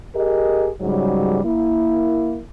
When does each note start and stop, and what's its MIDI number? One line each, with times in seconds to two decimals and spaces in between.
0.14 0.69 67
0.14 0.69 68
0.14 0.69 70
0.14 0.69 75
0.80 1.39 44
0.80 1.39 49
0.80 1.39 54
0.80 1.39 55
1.43 2.41 58
1.43 2.41 64